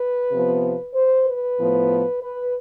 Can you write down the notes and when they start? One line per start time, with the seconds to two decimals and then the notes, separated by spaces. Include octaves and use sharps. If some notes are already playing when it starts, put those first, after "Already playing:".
Already playing: B4
0.29 C3 F3 B3
0.94 C5
1.25 B4
1.58 A2 F3 B3
2.21 B4